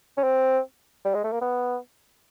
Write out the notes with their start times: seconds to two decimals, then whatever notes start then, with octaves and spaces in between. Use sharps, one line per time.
0.18 C#4
0.24 C4
1.05 G3
1.15 G#3
1.24 A3
1.32 A#3
1.41 B3